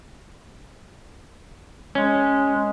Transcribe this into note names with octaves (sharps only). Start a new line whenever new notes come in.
G#3 C#4